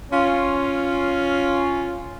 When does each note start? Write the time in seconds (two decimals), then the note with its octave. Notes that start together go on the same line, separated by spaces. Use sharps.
0.12 C#4 F4